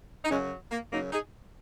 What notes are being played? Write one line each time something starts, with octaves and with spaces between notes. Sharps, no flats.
D#4
F#2 C#3 F#3 G#3 C#4
A#3
F#2 C#3 F#3 A#3 D#4
D#4 G#4